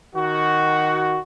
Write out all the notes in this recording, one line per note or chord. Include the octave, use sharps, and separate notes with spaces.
D#3 F#4